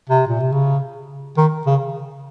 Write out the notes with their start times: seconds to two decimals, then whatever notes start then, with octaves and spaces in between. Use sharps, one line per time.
0.09 C3
0.27 A#2
0.40 C3
0.52 C#3
1.37 D#3
1.67 C#3